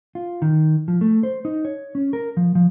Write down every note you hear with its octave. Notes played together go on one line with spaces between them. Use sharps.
F4
D#3
F3
A3
C5
D#4
C#5
C#4
A#4
F3
F3